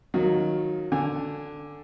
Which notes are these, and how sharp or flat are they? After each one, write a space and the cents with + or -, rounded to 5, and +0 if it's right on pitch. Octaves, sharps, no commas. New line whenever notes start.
D#3 +0 F#3 -15 F4 +0
D3 +0 G#5 -15